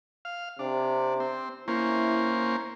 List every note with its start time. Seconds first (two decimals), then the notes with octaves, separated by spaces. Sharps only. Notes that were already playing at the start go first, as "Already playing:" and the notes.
0.25 F5
0.59 C3 D4
1.20 C4
1.68 A#3 C#4 E4 C5